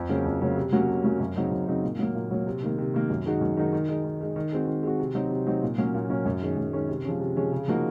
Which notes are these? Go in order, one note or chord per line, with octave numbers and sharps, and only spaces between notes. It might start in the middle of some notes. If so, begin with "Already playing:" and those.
Already playing: F2
C#3 F#3 A#3 C#4
F2
C#3 F#3 A#3 C#4
C3
F#3 A#3 C#4 F#4
C3
F#3 A#3 C#4 F#4
F#2
C#3 F#3 C4 D#4
F#2
C#3 F#3 C4 D#4
A#2
F#3 A#3
A#2
F#3 A#3
C3
D#3 A#3
C3
D#3 A#3
F#2
D#3 G#3 D#4 F#4
F#2
D#3 G#3 D#4 F#4
D#3
G#3 D#4
D#3
G#3 D#4
D#3
G#3 C4 F#4
D#3
G#3 C4 F#4
C3
F#3 C4 D#4
C3
F#3 C4 D#4
A#2
F#3 A#3 C#4
A#2
F#3 A#3 C#4
F#2
D#3 G#3 C#4
F#2
D#3 G#3 C#4
C3
F3 G#3 C#4
C3
F3 G#3 C#4
C#3
F3 A#3 D#4 F#4